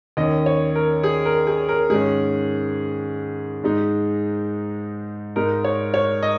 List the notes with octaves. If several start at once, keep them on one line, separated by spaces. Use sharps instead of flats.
D#2 D#3 C#4 D#5
C#5
A#4
G#4
A#4
G#4
A#4
G#2 D#3 G#3 C#4 G#4
G#2 G#3 D#4
G#2 G#3 D#4 A#4
C#5
C#5
D#5